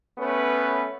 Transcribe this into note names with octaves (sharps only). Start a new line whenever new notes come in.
A3 B3 C#4 B4